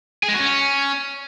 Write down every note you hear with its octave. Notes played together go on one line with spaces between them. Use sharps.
G#4
G#3
F#4
C#4